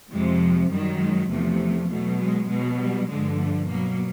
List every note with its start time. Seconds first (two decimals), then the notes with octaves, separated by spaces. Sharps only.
0.12 F2 C3 F3 G#3
0.72 F#2 D#3 F#3 G3
1.01 G#3
1.31 E2 C3 F3 A3
1.90 B2 F#3 A3
2.20 G#3
2.50 B2 F#3 G#3
2.79 G3
3.09 G2 D3 F3 G#3
3.40 A3
3.68 B2 F#3 A#3